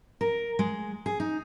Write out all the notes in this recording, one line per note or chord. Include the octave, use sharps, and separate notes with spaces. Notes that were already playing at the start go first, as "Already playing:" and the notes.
A#4
G#3
G#4
D#4